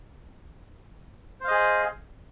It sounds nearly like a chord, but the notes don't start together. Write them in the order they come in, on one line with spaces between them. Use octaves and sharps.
C5 F5 D#5 G#4